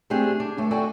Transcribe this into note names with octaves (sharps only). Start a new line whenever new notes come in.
A3 C4 D4 G4 G#4
D4
D#2 A3
F#4 A4 D5 E5 G5 G#5